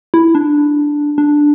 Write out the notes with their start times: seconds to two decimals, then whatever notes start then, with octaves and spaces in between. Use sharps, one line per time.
0.14 E4
0.35 D4
1.18 D4